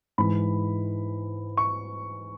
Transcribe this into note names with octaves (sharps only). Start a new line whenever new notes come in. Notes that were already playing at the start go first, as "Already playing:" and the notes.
G#2 E3 B5
C#6